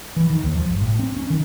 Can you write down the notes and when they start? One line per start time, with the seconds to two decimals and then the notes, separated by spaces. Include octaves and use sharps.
0.16 E3
0.30 D#3
0.43 D#2
0.56 F3
0.69 G1
0.81 A2
0.99 C4
1.17 C#4
1.30 D#3